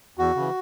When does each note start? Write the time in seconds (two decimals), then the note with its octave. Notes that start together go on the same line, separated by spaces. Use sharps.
0.18 E2 F#4
0.35 C#3 E3